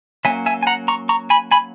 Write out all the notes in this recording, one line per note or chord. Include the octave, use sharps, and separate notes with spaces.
F#3 A#3 C#4 E5 G#5
E5 G#5
G#5
F#5 A#5
A#5 C#6
A#5 C#6
G#5 B5
G#5 B5